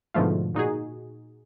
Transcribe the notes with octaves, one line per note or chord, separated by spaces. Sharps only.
G#2 B2 D3 F3 A3 F4
A#2 D#4 F#4 G#4